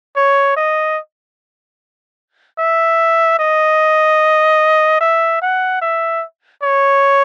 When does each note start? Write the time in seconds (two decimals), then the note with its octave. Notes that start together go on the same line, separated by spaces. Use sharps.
0.16 C#5
0.56 D#5
2.59 E5
3.39 D#5
5.01 E5
5.42 F#5
5.82 E5
6.63 C#5